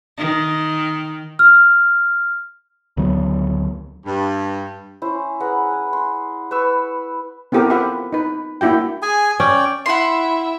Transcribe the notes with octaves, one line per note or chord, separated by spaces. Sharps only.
D#3
F6
D2 D#3 F#3 B3
G2
C#4 E4 C5
G#4 B4 F#5 A#5
G#5
C6
B4 C#6 E6
B3 C4 E4 G4 A4 A#4
F4 G4 B4 E5 F#5 G5
D#4 B4
A#3 D4 E4 F#4 G5
G#4 G#5
C#4 D5 G5
E4 E5 F#5 C6